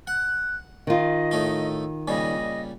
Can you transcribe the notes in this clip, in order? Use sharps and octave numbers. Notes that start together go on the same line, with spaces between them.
F#5 F#6
D#3 F4 D#5
A2 A3 D#4
A#2 C#3 G3 D#5